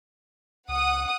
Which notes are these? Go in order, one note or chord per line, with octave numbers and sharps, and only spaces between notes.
C#2 F#5 D#6